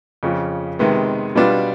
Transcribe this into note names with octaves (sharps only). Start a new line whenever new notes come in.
F2 C#3 F3
C3 D#3 G#3 B3
B2 G3 B3 D4 F4